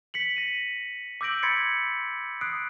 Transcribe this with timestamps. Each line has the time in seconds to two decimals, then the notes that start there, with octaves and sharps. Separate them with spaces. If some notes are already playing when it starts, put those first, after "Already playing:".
0.14 B6 C#7 F#7
0.36 A#6 D#7
1.21 D6 E6 G6 A#6 D7 F#7
1.43 B5 C6 G#6 A6 B6 C#7
2.41 D#6 F#6 C7 D7